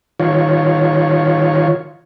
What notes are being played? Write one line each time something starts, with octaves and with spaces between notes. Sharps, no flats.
D#3 F4 C#5